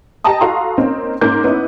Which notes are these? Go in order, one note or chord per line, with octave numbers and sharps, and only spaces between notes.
G4 D#5 G5 A5 A#5 D#6
F#4 A4 F5 A#5 C6
A#3 C4 C#4 D#4 A#4
G#2 A#3 C#4 D6 G6
B3 C#4 D#4 E4